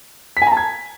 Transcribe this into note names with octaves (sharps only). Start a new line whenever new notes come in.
B6
G#5
A#5
A5
G#6